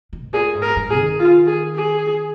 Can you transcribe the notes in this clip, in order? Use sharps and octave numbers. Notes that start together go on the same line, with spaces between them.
D#3
G#2
A#2 G#4
G#2
A#4
G#2
G#4
D#3
F4
G#4
G#4